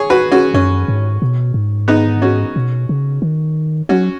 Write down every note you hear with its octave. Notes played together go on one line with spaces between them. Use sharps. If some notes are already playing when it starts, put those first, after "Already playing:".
Already playing: G#4 C#5
F#4 B4
C#4 F#4
F#2 C#4
G#2
B2
G#2
B3 D#4
C#4 F#4
B2
C#3
D#3
F#3 C#4 F#4